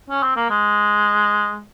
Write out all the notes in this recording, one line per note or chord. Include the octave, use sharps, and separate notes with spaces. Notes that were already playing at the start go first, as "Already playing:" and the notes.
C#4
C4
A#3
G#3